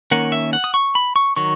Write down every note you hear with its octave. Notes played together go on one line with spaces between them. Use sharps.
D#3 A#3 C#4 F#5
E5
F#5
D#6
C#6
B5
C#6
D#3 F#3 C#6